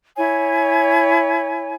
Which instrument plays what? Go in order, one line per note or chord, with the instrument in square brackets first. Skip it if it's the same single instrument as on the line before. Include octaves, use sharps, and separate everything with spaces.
[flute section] E4 C#5 G#5